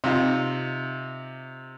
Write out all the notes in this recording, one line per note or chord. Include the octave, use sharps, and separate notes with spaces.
C3 D#4 F4